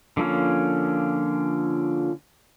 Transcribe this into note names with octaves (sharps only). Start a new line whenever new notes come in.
D3 F3 A#3 C#4